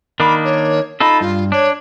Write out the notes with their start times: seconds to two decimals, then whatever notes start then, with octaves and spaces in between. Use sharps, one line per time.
0.20 D#3 A#3 D4 B5
0.44 C#5
1.00 D#4 F4 A4 B5
1.21 G2 F4
1.52 D4 C#5